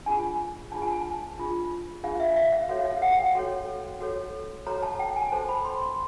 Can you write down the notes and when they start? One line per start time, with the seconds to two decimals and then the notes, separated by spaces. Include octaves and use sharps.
0.06 D4 F4 G#4 G#5
0.72 D4 F4 G#4 A5
0.82 G#5
0.91 A5
1.38 D4 F4 G#4
2.04 D4 F4 G#4 F5
2.20 E5
2.36 E5
2.52 F5
2.69 F#4 A4 C#5 F5
2.86 F5
3.02 F#5
3.18 G5
3.35 F#4 A4 C#5
4.00 F#4 A4 C#5
4.66 F#4 A4 C#5 A#5
4.83 A5
4.99 G5
5.16 G#5
5.32 F#4 A4 C5 A5
5.49 B5
5.65 C6
5.81 C6